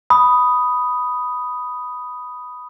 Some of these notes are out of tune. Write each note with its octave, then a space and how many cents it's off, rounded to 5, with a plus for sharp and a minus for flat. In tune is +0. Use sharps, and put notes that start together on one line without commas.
B5 +0 D#6 +0